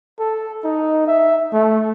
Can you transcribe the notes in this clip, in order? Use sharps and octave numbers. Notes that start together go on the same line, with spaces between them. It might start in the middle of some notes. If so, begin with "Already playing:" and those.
A4
D#4
E5
A3